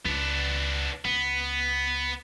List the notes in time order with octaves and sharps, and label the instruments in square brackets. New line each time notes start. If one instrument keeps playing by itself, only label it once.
[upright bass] C#2 [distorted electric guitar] B3 D4
[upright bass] C#2 [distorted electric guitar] B3